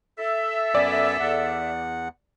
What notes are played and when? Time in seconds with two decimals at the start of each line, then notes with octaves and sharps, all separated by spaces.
0.19 A4 E5
0.75 F#2 B3 D5 G#5
1.20 E2 F#5